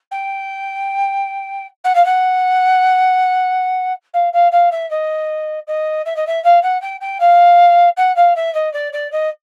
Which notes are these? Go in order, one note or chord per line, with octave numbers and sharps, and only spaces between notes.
G5
F#5
F5
F#5
F5
F5
F5
E5
D#5
D#5
E5
D#5
E5
F5
F#5
G5
G5
F5
F#5
F5
E5
D#5
D5
D5
D#5